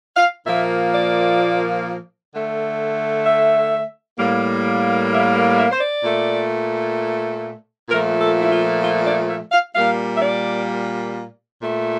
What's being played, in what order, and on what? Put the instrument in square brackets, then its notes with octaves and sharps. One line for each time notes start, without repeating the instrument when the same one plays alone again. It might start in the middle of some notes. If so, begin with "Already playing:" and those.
[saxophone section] F5
A#2 F3 A#3 E5
D5
D3 A3
E5
A2 G3 A#3
E5
E5
C5
D5
A#2 A3
A#2 F3 A3 A#4
A4
E4
F4
F4
D5
E5
F5
A#2 G3 A#3 F5
E5
D5
A#2 A3